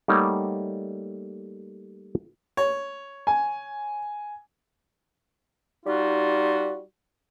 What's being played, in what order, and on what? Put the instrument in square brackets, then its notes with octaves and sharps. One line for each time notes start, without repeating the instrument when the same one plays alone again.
[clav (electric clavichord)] G3 A3 A#3 D#4 C#5 F#5
[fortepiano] C#5
[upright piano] G#5
[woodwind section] G3 D#4 F4 F#4